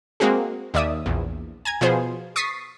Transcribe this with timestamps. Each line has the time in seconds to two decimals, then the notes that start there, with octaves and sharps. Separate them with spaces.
0.20 G#3 A#3 C4 F#4 G#4
0.74 D#2 D5 E5 D#6
1.06 A#1 E2
1.65 G#5 A#5 G#6
1.81 B2 F3 B3 G#4 C5
2.36 C#6 D#6 A6 B6 C7